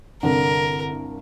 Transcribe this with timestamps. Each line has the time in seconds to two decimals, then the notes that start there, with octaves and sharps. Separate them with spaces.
0.23 C2 G2 D3 A#4